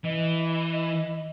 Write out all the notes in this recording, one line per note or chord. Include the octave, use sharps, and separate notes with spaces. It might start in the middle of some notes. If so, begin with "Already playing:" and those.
E3 D#5
D#5